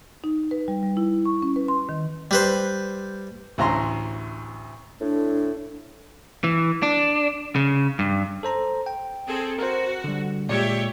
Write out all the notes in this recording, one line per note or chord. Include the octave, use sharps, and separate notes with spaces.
D#4
B4
G3
G3
E4
C#6
C#4
B4
C6
D#3
G3 B4 C5
A1 D2 A#5 C6
A2 D4
E3
D4
C#3
G2
A4 C5 A#5
G5
C4 G#4 A4
F#4 A#4 C5
D3 G3
A#2 G#3 G4 C#5 D5 E5